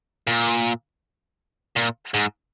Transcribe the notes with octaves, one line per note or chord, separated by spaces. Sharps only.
A#2
A#2
G#2